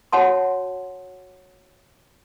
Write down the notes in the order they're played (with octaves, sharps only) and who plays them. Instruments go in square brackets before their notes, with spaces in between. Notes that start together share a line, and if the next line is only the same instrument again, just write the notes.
[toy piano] F#4 C#5 F#5 A5 C6